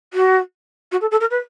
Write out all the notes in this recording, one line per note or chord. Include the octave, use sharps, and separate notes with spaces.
F#4
F#4
A4
A4
A#4
B4